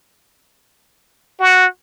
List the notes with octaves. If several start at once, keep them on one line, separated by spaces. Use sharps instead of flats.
F#4